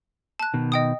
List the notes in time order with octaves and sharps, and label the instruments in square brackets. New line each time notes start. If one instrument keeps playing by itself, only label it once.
[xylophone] A5 F#6
[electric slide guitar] B2 D#3
[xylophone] D#5 G5 D#6